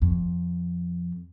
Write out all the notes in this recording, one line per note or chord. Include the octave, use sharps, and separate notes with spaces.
F2